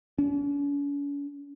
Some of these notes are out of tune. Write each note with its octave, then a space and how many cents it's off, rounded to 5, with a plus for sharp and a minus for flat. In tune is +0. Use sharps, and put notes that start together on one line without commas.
C#4 +45